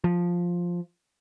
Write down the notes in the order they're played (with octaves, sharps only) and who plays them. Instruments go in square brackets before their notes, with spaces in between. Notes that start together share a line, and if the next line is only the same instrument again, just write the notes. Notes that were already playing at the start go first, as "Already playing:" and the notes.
[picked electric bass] F3